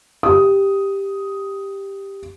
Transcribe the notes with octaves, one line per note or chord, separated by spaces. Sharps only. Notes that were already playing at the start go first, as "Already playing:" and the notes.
G4 D#6